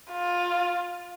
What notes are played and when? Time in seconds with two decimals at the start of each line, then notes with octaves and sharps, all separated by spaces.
0.11 F4